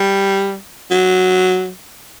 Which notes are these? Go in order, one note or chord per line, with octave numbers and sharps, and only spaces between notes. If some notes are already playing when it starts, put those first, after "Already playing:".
Already playing: G3
F#3